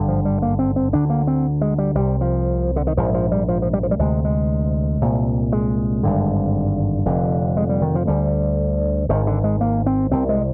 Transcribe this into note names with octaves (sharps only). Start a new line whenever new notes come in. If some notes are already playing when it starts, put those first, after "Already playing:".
Already playing: G#1 G2 D3
F3
G3
A#3
C4
C4
D2 D3 D4
A#3
C4
G#3
G3
C2 C3 G3
F3
D3
D#3
A#1 G#2 F3
F3
G3
F3
F3
G3
F3
G3
D2 C3 G#3
G#3
C2 A#2
G#3
G#1 G2 D3
F1 F2 D3
G#3
G3
D#3
F3
D2 D3 G3
G#1 G#2 D#3
D3
G#3
A#3
C4
C2 C3 C4
G#3